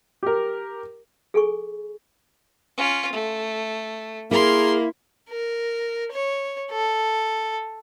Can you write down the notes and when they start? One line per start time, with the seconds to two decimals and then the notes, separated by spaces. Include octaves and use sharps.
0.23 G4 A#4
1.34 G#4 A4 G#5 C#6
2.77 C#4 F4
3.13 A3
4.31 A#3 E4 G#4 A#4 C6
5.29 A#4
6.12 C#5
6.72 A4